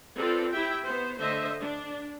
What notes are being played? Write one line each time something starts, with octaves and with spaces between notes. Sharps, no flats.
C4 F4 A4 B4 D5
E4 G4 E5 G5
B3 C5
D3 A3 C5 D#5 E5
D4